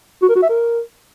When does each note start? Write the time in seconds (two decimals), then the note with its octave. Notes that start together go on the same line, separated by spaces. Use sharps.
0.22 F#4
0.29 A#4
0.36 F#4
0.42 E5
0.49 A#4